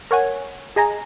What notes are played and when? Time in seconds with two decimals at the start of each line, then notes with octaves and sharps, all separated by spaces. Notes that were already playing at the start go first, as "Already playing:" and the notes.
0.11 A#4 C#5 F#5 G#5
0.76 G#4 D#5 G#5 A#5